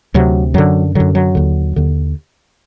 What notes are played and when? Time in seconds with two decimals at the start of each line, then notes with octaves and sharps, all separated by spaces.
0.14 D2 C3 F#3
0.54 F#2 D3 F#3
0.95 F#2 D3 F#3
1.15 F#3
1.35 D#2 D3
1.76 D#2 D3